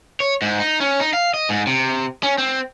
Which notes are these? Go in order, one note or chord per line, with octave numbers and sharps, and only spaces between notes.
C#5
G#2
D#4
C#4
D#4
F5
D#5
G#2
C3
C#4
C4